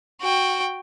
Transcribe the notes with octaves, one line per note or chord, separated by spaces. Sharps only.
F#4 G5